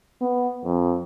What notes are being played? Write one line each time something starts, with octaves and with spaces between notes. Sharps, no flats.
B3
F2